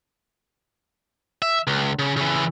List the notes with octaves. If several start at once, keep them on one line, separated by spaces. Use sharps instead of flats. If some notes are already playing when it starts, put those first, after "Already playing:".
E5
C#2
C#3
C#3 E3